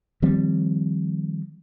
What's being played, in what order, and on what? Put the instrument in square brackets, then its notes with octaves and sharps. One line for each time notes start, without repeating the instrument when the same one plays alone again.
[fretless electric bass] D#3 F3 G3 C4